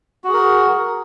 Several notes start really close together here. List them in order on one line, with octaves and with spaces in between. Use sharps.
F#4 G#4 A#4